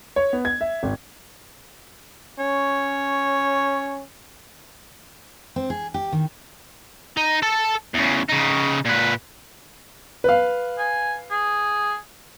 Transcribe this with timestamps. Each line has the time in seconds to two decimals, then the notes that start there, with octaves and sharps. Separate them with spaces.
0.16 C#5
0.33 B3
0.45 G#6
0.61 E5
0.83 G#1
2.39 C#4 C#5
5.56 C4
5.70 G#4
5.94 G4
6.12 D#3
7.17 D#4
7.42 A4 A5
7.94 E2 C#3
8.29 C#3 D#4
8.85 A#2 B4
10.24 B4 F5
10.78 G#5
11.30 G#4